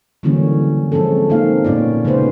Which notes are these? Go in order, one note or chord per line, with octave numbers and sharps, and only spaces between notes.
D3 E3 F#3 G3 A#3 C#4
F3 G#3 C4 C#4 A4
F3 A3 A#3 C4 D#4 F5
A#2 B3 C#4 F4 D5
C#3 G#3 B3 D#4 B4 C5